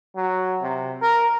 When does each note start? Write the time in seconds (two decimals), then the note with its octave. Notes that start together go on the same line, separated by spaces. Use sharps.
0.16 F#3
0.62 C3
1.02 A#4